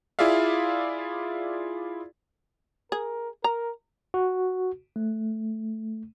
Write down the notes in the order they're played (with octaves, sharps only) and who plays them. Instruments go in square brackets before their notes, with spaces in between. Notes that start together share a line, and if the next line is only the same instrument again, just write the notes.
[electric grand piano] E4 F4 G#4 D5 E5 F5
[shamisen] G#4 [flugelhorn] A#4
[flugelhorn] A#4 [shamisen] A#5
[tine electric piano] F#4
A3